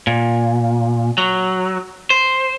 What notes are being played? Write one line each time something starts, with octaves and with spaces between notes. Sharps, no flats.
A#2
F#3
C5